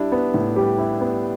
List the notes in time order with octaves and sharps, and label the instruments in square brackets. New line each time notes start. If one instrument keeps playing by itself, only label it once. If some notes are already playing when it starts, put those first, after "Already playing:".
Already playing: [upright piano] G3 E4 [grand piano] D4
[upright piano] B3
A2
[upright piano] G3 [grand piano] G4
[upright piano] E4
B3